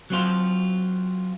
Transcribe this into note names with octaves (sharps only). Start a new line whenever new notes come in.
F#3 C4 F4